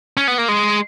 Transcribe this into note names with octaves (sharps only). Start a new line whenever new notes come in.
C#4
B3
A#3
G#3